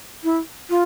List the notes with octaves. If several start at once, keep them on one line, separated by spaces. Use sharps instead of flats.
E4
F4